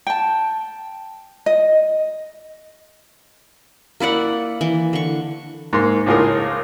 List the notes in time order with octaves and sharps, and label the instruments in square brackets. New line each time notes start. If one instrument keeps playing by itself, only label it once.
[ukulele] G5 A5
D#5
[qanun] A#3 E4 D5 F#5
E3
D3 C#6
[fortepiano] G#2 A#3 C6
C#2 A2 F4 G#4 A#4